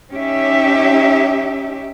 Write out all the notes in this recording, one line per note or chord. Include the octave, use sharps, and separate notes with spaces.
C#4 D#4 G4 E5